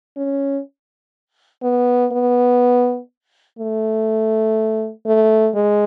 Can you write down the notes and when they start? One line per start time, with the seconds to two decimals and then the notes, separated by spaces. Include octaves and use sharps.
0.17 C#4
1.63 B3
2.12 B3
3.59 A3
5.06 A3
5.55 G#3